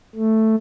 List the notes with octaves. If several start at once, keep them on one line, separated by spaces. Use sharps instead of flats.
A3